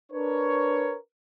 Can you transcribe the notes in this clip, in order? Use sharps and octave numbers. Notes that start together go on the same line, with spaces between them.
D4 A#4 B4 C#5